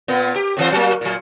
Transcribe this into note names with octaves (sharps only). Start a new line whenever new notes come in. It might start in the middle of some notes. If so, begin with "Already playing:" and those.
A#2 B3
G4
F2 E3 C5
F#3 A#3
A#2 F#3